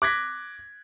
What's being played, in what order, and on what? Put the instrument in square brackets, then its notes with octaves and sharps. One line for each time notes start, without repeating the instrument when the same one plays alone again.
[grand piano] D6 F#6 G#6 A#6 B6